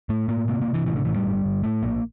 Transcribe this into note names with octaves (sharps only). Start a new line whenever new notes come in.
A2 A3
A2 A#3
C3 A#3
A#3
C3
E3
A2 E3
D3
A2 E3
G3
G1
G1
A2 A3
A#1 A#3